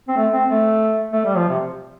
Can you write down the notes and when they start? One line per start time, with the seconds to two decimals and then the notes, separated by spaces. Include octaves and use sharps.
0.08 C4
0.17 A3
0.33 C4
0.49 A3
1.13 A3
1.25 G3
1.37 F3
1.49 C3